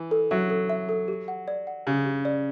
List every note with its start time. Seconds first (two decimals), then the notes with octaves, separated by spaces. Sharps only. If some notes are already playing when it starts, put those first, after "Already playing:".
Already playing: E3
0.11 A4
0.31 F#3 E5
0.50 A4
0.70 E5
0.89 A4
1.08 G4
1.28 F#5
1.48 D5
1.67 F#5
1.87 C#3 G4
2.06 G4
2.25 D5